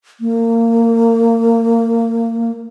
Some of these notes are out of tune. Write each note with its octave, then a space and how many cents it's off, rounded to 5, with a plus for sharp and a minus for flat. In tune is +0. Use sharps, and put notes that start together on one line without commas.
A#3 -25